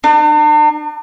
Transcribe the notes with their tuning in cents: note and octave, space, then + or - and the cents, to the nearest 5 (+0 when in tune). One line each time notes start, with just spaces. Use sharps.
D4 +45